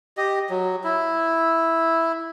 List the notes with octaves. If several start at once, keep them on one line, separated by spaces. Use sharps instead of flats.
G4 D#5
F#3
E4